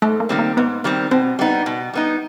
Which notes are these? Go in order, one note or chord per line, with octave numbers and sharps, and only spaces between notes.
G#2 A3
A#3
D#3 G3 C4
A#3
G#2 B3
D#3 G3 C4
B2 C4
G3 B3 D#4
B2
G3 B3 D#4